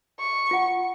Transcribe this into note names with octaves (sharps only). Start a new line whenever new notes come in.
C#6
F4 F#5